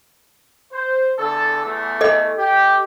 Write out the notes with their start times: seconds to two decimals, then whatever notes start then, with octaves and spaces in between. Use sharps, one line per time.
0.72 C5
1.18 E2 D3 A4
1.64 E2 A3
2.01 A4 D#5
2.37 G4